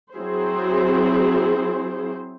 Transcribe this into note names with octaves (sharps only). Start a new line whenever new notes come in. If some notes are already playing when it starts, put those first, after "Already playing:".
F#3 C4 E4 G#4 C5